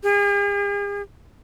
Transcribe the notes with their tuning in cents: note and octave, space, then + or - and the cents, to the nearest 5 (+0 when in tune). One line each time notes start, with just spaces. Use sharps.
G#4 -45